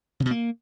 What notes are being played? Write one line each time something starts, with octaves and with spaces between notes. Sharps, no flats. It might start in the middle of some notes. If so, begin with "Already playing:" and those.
C#3
B2
A#3